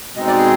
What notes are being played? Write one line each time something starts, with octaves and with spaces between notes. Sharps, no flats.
B2 G#3 C4 D#4 D#5
D5
G#4